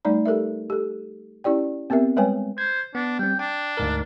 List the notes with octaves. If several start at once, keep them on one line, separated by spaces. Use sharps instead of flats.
G3 A3 D#4 D5 A#5
G4 A4 A#4 E5
G4 A4
C#4 E4 G4 D5 G5
B3 C4 G4 A#4 E5
G3 G#3 B4 C#5 G5 G#5
C5 G#6
B3 D4
G3 C4 G5
D4 G5
D2 G#2 A#4